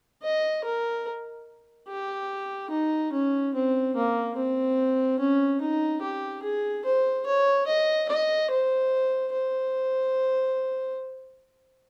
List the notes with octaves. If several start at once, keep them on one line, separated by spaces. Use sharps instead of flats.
D#5
A#4
G4
D#4
C#4
C4
A#3
C4
C#4
D#4
G4
G#4
C5
C#5
D#5
D#5
C5
C5